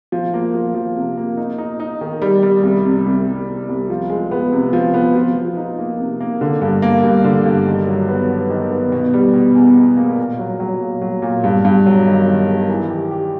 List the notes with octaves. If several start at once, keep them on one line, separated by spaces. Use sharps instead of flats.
F3
A#3
F3
F3
C3
A#3
D#4
D#4
D#4
D#3
G3
G3
C2
C3
C2
C2
C3
C2
F3
G#3
B3
C3
F3
B3
F3
F3
D#4
A#3
C3
A#3
D3
G2
A#3
G2
D3
G2
D#3
F#3
B3
B3
D#3
B3
B2
G3
B2
E2
E2
A#3
A#2
F#3
F#3
A#2
F#3
A#2
G2
G2
F#3
D#3
D#3
D#3
E3
G4
G4